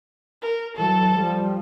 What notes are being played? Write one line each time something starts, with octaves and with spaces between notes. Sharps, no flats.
A#4
E3 F#3 A4
F3 G3